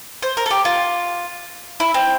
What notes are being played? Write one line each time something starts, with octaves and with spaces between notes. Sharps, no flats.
C5
A#4
A4
G4
F4
E4
C4